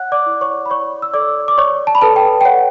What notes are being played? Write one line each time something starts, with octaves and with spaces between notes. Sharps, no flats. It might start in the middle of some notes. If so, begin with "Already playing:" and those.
Already playing: C#5 F#5 F#6
D5 D6
E4
C#5 C#6
B5
C#5 D5 C#6
E6
A4 D5 D6
D6
C#5 D5 C#6
A5
B5
A4 B4 A5
G5
G5
C#5 F#5